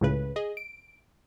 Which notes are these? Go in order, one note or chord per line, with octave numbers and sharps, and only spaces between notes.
C#2 A2 C#3 B4
G#4 D#5
D7